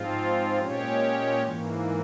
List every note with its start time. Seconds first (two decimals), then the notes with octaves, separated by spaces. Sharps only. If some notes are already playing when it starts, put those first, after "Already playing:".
Already playing: G#2 F3 C4 F4
0.59 A#2 G#3 C#4 G4 C#5
1.43 G#2 E3 A#3